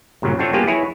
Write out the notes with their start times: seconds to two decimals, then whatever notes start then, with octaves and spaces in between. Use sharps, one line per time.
0.22 G2 A#2 C#3 F#3
0.39 C4 D4 F4 F#4 A4 C#5
0.53 G3 A#3 B3 F4 G4 G#4
0.67 E4 F#4 G#4 B4 C#5